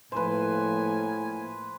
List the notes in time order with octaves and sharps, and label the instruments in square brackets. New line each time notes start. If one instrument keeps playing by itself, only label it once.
[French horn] A2 [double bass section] F3 A#3 [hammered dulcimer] B4 C5 [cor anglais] G#5